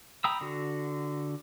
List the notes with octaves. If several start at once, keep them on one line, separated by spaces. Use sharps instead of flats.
G5 A#5 B5 D#6 E6
D3 F#4